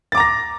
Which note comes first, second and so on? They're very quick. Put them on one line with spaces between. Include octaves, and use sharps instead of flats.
A6 D6 A#5 A#6